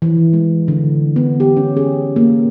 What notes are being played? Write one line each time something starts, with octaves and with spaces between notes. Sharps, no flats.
E3
G#3
D3
B3
G4
C#4
G#4
A#3